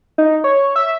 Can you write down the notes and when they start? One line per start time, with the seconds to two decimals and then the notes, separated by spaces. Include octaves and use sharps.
0.18 D#4
0.44 C#5
0.76 E5